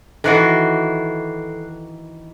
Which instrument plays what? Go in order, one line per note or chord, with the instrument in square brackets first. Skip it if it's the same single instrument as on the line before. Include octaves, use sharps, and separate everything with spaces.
[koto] D#3 E3 F#4 [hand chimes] A4 F#6 C7